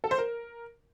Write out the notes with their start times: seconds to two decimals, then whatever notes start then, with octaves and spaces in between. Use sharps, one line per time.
0.04 A4
0.11 C5
0.18 A#4